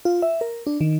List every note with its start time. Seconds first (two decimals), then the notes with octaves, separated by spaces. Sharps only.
0.05 F4
0.22 E5
0.41 A#4
0.67 D4
0.81 D#3